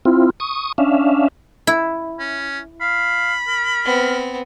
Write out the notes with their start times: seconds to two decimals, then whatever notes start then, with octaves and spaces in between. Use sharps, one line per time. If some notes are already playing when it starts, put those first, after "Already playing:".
0.05 C4 E4 F4
0.40 C#6 D#6
0.78 C#4 D4 E5 F5
1.67 E4
2.19 C#4
2.81 F5 B5
3.47 A#4
3.85 B3 C4